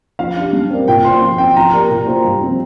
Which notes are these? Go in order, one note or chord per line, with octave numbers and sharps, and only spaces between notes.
F3 F5
D4 G4
G3
C4 A#4 D5
A#2 G5
A#3 F4 C5 C6
F3
C4 F4 G5
F3 A#5
A#3 G4 A#4 D5
A#2
A#3 F4 C5
G2
F3 C4 F4